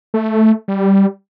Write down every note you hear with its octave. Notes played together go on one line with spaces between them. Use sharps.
A3
G3